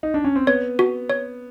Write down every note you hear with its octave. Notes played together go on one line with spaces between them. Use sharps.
D#4
D4
C#4
C4
B3 C#5
F#4
C#5